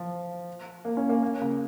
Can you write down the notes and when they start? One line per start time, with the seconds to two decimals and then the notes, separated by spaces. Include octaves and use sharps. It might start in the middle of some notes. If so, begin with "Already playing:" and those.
Already playing: F3
0.85 A#3
0.97 C#4
1.09 A#3
1.23 A#3
1.41 C#3